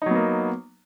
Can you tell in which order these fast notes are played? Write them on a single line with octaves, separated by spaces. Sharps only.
D#4 F#3 B3 A#3